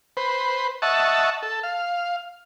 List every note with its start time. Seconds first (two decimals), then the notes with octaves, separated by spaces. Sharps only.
0.17 B4 C5
0.82 D#5 E5 F#5 A5 C#6
1.43 A4
1.63 F5